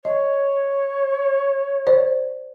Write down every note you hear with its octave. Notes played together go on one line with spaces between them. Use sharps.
C#5 D#5
C5 D5